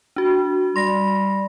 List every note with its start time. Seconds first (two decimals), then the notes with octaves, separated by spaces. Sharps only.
0.16 D4 F#4
0.76 G3 C6 A#6